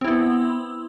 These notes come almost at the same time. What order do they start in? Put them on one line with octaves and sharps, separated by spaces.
C4 E4 B3